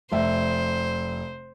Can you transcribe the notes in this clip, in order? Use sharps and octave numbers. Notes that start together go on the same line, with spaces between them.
F1 C5 E5